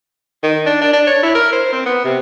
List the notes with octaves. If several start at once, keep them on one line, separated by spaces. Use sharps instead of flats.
D#3
D4
D4
D4
C#5
E4
A#4
C5
C4
B3
C3